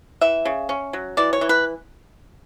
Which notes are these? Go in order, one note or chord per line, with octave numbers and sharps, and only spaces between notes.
E3 E5
C#3
C#4
F#3
E3 D5
C#5
E3
B4